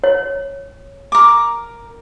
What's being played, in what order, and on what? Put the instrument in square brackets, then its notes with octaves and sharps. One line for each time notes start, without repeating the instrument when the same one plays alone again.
[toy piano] C#5
[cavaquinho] A#4 D6